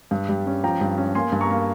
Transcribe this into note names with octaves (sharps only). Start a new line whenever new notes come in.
G2
G3
C#4
F3 G5 A#5
G2
C#4
A#3 G#5 C6
G2
A#5 C#6
A#3